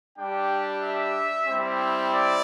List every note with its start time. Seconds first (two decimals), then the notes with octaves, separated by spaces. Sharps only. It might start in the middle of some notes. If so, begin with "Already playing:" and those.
0.18 G3 D4 G4 G5
0.83 E5
1.47 G3 C4 E4
2.12 D5